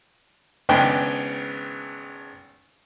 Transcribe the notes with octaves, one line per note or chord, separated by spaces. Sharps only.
G#1 C#3 G#3 B3 D4 G5